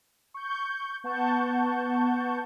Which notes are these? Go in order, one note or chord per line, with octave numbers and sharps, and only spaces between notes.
C#6 G6
B3 F#5 A5 C#6 G6